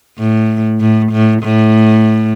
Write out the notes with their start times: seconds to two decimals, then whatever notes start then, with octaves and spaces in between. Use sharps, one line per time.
0.18 A2
0.80 A2
1.12 A2
1.43 A2